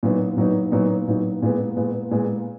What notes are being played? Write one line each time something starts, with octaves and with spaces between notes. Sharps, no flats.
A#2 F#3 B3 D#4
A#2 F#3 B3 D#4
A#2 F#3 B3 D#4
A#2 F#3 B3 D#4
A#2 G#3 B3
A#2 G#3 B3
A#2 G#3 B3